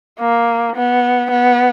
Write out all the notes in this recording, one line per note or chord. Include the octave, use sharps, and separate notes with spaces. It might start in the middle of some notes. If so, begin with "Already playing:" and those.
A#3
B3
B3